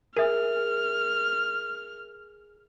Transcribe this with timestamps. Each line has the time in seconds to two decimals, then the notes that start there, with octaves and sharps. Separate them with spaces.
0.16 G#4 A#4 E5 F6